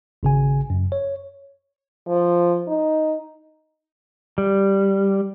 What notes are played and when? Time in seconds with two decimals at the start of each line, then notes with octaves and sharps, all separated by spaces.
0.23 G#1 C#3 G#5
0.70 F#2
0.92 C#5
2.08 F3
2.67 D#4
4.38 G3